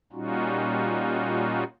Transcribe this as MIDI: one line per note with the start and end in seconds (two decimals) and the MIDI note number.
0.13 1.64 46
0.13 1.64 55
0.13 1.64 61
0.13 1.64 63
0.13 1.64 65
0.13 1.64 66